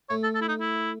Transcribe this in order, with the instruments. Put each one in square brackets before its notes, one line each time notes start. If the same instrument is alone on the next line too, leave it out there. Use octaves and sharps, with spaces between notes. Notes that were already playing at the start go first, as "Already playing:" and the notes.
[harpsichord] A3 [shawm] C#5
[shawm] A4
A4
E4
D#4
E4